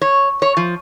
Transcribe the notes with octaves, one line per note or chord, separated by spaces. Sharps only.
C#5
C#5
F3